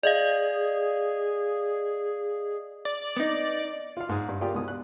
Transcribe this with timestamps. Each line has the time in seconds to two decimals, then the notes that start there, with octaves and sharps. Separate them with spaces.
0.03 G#4 D5 D#5 F5
2.85 D5
3.17 B3 D#4
3.97 F4 F5
4.09 G#2 G#4
4.29 G2
4.41 A#3 F4 G4 G#4 D5 G5
4.54 C2 B2 G#3 D#6
4.68 F#6